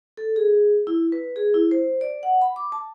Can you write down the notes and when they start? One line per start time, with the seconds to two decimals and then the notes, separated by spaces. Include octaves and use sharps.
0.17 A4
0.36 G#4
0.87 E4
1.12 B4
1.36 G#4
1.54 E4
1.71 C5
2.01 D5
2.23 F#5
2.42 B5
2.56 D6
2.72 A5